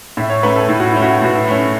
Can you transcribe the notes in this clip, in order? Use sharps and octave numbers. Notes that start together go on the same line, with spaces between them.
A2 E5
C#5
A3 C#4 B4
A4
A2 E4
F#4
A3 C#4 E4
F#4
E4
A2 F#4
E4
A3 C#4